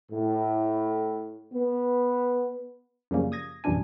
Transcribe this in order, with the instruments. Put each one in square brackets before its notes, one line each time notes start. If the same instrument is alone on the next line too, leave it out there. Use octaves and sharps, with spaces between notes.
[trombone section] A2
B3
[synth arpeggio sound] F#2 C#3 F3 G3 A#3 C#4
D#6 G#6 A#6
A1 F#2 B2 G3 D4 G#5